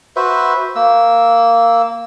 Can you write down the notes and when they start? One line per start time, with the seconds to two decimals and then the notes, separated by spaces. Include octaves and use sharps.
0.16 F#4 B4 C5 E5
0.76 A#3 E6